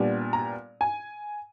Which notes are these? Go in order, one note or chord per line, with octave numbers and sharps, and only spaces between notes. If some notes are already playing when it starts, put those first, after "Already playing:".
Already playing: A#2 G3 B3 D4
A#5
G#5